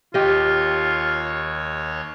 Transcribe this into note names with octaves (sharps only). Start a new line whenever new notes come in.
D#2 F4 G4 C#5 D#5